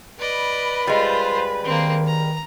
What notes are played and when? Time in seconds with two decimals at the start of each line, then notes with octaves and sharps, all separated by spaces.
0.19 B4 D5 D#5 B5
0.87 G3 G#3 F4 C5
1.64 D#3 A#3 C4
2.06 A#5